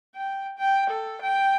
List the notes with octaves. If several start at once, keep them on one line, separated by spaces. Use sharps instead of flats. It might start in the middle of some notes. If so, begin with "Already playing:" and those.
G5
G5
A4
G5